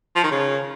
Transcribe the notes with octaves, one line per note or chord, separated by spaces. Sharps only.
F3
D#3
C#3